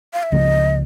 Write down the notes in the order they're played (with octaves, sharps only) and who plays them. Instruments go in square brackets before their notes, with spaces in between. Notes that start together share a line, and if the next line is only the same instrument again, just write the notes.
[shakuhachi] F5
E5
[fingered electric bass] C#2 C#3 F3 A#3 [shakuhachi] D#5